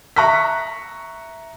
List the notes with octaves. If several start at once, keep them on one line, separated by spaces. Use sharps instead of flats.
E5 A#5 C#6 F#6 B6